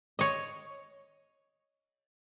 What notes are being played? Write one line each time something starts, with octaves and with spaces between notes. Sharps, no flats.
C#5 D#5